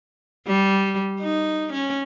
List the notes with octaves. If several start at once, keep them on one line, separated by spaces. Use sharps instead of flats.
G3
D#4
C#4